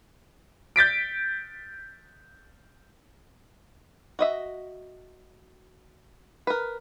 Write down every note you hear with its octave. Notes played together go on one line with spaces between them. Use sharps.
G6 A6 B6 D7
F#4 D#5 E5
A#4 B4